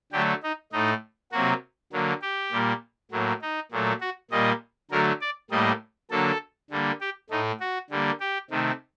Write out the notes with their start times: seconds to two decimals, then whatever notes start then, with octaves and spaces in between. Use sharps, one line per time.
0.12 D3 F#3 A3 G4
0.43 D#4
0.72 A2 A3 D#4
1.32 C3 F#3 A#3 F#4
1.93 D3 F#3 A#3
2.22 G4
2.52 A#2 G3 A#3
3.12 A2 F#3 A#3
3.41 D#4
3.72 A#2 F#3 A3
4.01 F#4
4.31 A#2 G3 A#3 D#5
4.91 D3 F#3 A3 A#4
5.21 D5
5.51 A2 G3 A#3 D#5
6.10 D3 F#3 A#3 A4
6.70 D3 G3 A#3
7.00 G4
7.30 A2 A3 D#4
7.60 F#4
7.90 D3 G3 A#3
8.20 G4
8.50 C3 D#3 A3